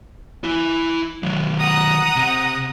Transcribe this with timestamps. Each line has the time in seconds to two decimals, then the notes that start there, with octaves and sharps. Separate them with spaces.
0.44 E4 G#5
1.23 D#3 F#3
1.58 F#5 A#5 D#6
2.16 C3